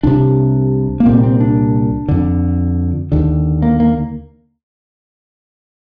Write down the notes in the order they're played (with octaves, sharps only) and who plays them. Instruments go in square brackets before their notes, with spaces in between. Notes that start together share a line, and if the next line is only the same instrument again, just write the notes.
[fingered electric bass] C2 C3 D4
A#3
C2 A#2 C4
C4
D4
F2 D3
D#2 D3
A#3
A#3